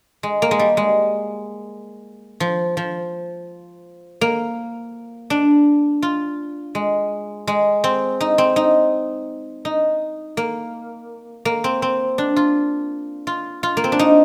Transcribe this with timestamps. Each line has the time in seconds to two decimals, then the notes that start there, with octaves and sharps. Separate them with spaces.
0.23 G#3
0.42 A#3
0.51 G#3
0.59 G3
0.77 G#3
2.40 F3
2.77 F3
4.21 A#3
5.30 D4
6.02 F4
6.75 G#3
7.47 G#3
7.84 C4
8.21 D#4
8.38 C4
8.56 D#4
9.65 D#4
10.37 A#3
11.45 A#3
11.64 C4
11.82 C4
12.18 D4
12.36 F4
13.27 F4
13.63 F4
13.77 A#3
13.84 C4
13.92 D4
13.99 D#4